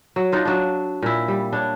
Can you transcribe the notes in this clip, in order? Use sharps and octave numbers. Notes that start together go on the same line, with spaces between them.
F#3
D4 D#4 F4
F#3 D4
A#2 E4
G3
D4 C#5